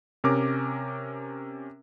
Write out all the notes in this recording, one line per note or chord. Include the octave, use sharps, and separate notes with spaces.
C3 C#4 A#4 D6